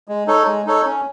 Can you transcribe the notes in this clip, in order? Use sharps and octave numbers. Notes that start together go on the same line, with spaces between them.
G#3
D#4 A4 C#5
G#3
D#4 A4 C#5
C#4